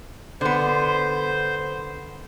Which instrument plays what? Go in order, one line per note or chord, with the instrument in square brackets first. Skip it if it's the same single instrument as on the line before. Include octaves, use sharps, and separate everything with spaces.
[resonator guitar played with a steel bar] D3 B3 [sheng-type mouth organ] C5